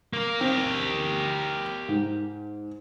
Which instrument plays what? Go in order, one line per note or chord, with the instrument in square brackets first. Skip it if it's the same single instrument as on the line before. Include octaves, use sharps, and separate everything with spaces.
[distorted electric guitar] A#3 A#4
[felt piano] C4 [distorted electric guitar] G4 A#4
[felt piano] G#2